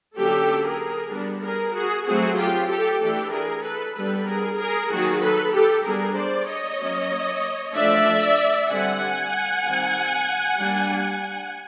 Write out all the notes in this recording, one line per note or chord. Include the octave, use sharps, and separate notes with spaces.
D3 F#3 A#3 C#4 G4 A4
G#4 A#4
G3 B3 D4
G#4 A#4
F#4 G#4
F#3 A3 C4 F#4 G#4
F4 G4
G4 A4
E3 A3 D4 G4 A4
G#4 A#4
A4 B4
G3 B3 D4 A4 B4
G#4 A#4
G#4 A#4
D#3 F#3 A#3 F#4 G#4
A4 B4
G4 A4
G3 B3 D4 G#4 A#4
C5 D5
C#5 D#5
F#3 A#3 C#4
F3 A3 D4 D5 E5
D3 G3 C4 F#5 G#5
D#3 G3 C4
G3 A#3 D4